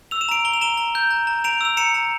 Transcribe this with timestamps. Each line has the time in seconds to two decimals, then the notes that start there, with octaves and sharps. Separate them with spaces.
0.11 E6 F7
0.21 E7
0.29 A#5 D7 F7
0.45 A#5 G7
0.54 F7
0.61 A#5 E7 G7
0.77 A#5
0.95 G6
1.11 A#5
1.27 A#5
1.44 A#5 D7 F7
1.61 E6 F7
1.77 A#5 C#7 E7
1.94 A#5